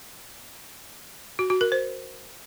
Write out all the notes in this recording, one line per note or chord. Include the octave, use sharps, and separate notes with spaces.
F#4
F#4
A#4
C5